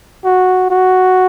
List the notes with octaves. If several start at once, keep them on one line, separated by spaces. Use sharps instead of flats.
F#4
F#4